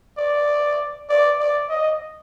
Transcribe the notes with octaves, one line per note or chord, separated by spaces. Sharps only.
D5
D5
D5
D#5